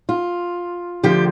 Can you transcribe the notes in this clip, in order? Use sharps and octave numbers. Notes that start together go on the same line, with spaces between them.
F4
D2 D3 F3 G4